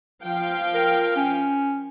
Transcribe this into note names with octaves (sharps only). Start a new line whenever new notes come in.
F3 F5 G5
A#4
C#4